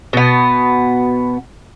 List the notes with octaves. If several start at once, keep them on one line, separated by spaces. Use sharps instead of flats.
B2 B3